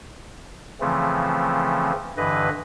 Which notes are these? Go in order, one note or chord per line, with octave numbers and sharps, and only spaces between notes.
C#3 E3 F3 A3 C4
G2 D3 E3 B4 D#5